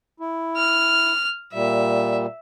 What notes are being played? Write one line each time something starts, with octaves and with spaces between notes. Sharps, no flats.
E4
F6
A#2 G3 E5